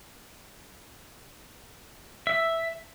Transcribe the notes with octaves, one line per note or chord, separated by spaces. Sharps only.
E5